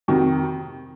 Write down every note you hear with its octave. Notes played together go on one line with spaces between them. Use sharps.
F2 C3 D#3 D#4 F#4